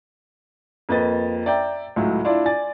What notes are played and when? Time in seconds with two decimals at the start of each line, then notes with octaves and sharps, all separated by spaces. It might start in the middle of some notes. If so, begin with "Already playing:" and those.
0.89 F2 A#3 B4 D#5 A6
1.46 D5 E5 G5 A#5
1.96 C#2 A2 F#3
2.25 D4 E4 F4 D5
2.46 D5 G#5 A6